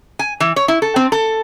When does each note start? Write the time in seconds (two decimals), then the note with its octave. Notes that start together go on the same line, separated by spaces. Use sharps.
0.19 G#5
0.40 E3
0.56 C#5
0.68 E4
0.82 A4
0.96 C4
1.12 A4